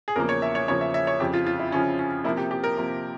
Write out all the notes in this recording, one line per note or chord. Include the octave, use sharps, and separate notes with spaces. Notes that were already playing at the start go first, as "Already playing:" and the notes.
G#4
E2 C#3 F3 A#3 A#4
C#5
E5
C#5
E2 C#3 F3 A#3 C#5
E5
E5
C#5
F2 C#3 F3 G4
F4
F4
E4
F2 C#3 F3 C#4
C#4
C3 F3 A#3 E4
G4
G4
A#4
C3 F3 A#3